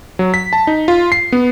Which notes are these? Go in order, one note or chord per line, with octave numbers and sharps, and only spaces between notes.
F#3
B6
A5
D#4
F4
C7
B3